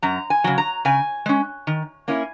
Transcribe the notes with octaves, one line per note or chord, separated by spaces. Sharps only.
F#2 A#5
G#5
C#3 F#3
A#5
C#3 G#5
G#3 C#4
D#3
A#3 C#4 E4